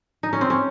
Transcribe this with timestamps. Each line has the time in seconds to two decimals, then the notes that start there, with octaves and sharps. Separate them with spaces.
0.23 D#4
0.33 C#4
0.41 C4
0.50 C#4